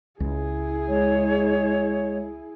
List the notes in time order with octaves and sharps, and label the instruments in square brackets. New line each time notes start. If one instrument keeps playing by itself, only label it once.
[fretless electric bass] C#2 [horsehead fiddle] E4 G#4
[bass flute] G#3 [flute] C#5